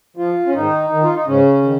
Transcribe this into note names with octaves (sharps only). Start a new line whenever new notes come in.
F3 F4
C#4
G#2 D#3 D#4
D#3
F4
D#4
G#2 C#3 C#4
D#3